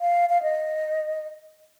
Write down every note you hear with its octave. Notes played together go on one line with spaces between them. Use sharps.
F5
F5
D#5